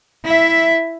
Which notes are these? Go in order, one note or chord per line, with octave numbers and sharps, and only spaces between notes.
E4 E5